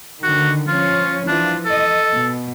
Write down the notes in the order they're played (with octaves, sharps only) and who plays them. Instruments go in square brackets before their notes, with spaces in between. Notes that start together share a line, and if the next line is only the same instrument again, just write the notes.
[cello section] D3 D#3 [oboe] F#4
[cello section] F3 C#4 C#5 [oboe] F4
[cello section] E3 F3 F4 [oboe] D4
[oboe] A4 [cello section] D#5
[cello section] B2